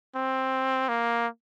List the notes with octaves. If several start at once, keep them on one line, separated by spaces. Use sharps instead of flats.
C4
A#3